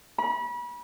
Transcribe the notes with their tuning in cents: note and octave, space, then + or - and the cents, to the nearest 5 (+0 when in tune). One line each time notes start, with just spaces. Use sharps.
B5 -35